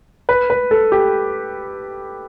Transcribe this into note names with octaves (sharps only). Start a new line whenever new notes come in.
B4
B4
A4
G4